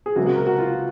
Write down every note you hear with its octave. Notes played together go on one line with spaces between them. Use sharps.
G#4
C#2 C3 F#3 A#3 F#4
F#4
A#4
F#4
F4